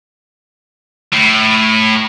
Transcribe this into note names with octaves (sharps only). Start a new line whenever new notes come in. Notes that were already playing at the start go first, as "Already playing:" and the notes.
A2